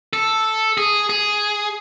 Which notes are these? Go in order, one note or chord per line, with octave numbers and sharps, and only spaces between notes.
A4
G#4
G#4